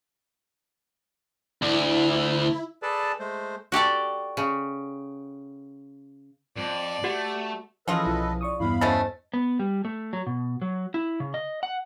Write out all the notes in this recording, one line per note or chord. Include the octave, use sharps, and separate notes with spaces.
D2 E4
G#4 A4 B4 D5 A5
G#3 A3 C5
F#4 G4 A4 D5
C#3
F2 D5
A3 F#4 G4 F#5
E3 F3 C#4 F4 G#4 A4 B4 D#5
B1 F3 E4
D5 C#6 D#6
E2 G2 B3 E4 F5 B5
A3 C#4 E4 C5 D#5 A6
B3
G3
A3
F#3
B2
F#3
E4
C#3
D#5
F#5